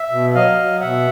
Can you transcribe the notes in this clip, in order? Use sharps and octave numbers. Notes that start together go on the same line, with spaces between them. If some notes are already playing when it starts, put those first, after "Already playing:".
Already playing: E5
B2
F#3 D#5 F5
F#3
B2 E5 F#5